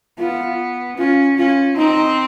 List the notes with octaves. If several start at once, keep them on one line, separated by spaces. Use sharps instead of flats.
B3 F4
C#4 F4
C#4 F4
C4 D#4